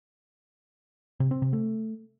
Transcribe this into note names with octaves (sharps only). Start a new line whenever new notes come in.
C3
C4
C3
A3